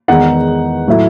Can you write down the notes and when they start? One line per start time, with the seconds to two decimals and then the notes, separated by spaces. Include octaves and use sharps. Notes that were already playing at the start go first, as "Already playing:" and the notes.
0.08 E2 D#3 G#3 B3 D#4 F#5
0.87 A2 F#3 A3 E4